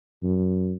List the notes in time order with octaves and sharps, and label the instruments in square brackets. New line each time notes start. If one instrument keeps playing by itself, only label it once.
[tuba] F#2